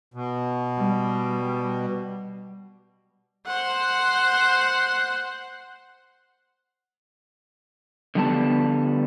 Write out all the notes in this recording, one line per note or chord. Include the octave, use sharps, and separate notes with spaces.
B2
G3
C5 F#5
D3 F3 G3 B3 G5 A5